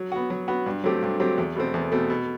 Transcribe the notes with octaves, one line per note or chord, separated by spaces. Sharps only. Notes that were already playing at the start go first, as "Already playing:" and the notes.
Already playing: F#3
B3 F#4
F#3
B3 F#4
G2
F#3 A3 C4 G4
G2
F#3 A3 C4 G4
E2
B2 A3 C4
E2
B2 A3 C4
B2